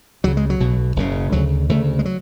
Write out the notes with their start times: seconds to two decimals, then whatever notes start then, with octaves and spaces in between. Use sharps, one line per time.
0.24 C#2 C#3 F#3
0.37 G#3
0.50 F#3
0.60 B1 B2
0.96 F#1 F#2 C#3
1.32 D2 C#3 F#3
1.69 D2 C#3 A3
1.99 G#3
2.05 F#3